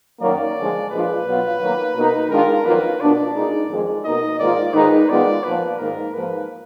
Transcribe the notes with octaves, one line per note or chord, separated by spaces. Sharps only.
F#2 D#3 F#3 A#3 D5
D3 F3 G#3
A#2 F3 G#3 D4 F4 B4
B2 F#3 B3 F4
D#3 F#3 A#3
B2 A#3 D#4
D#3 G#3 D4 F4 A#4
F2 D#3 F#3 A#3 F4 B4
B2 A#3 D4 F4 D5
A#2 G#3 D#4
F2 D#3 G#3
B2 A#3 D#4 D#5
G#2 D#3 A#3 F4 D5
G#2 D#3 G#3 D#4 B4
D#3 G#3 B3 F4 D5
A#2 F3 A#3 B4
G#2 D#3 A#3 A#4
G#2 F3 A#3 B4